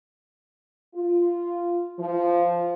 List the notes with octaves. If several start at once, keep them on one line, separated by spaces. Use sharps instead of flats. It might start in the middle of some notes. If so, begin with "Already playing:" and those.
F4
F3